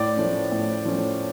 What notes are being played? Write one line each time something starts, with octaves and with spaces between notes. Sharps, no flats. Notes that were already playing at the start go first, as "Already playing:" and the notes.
Already playing: A2 D5
F3 A3 C#4
A2
F3 A3 C#4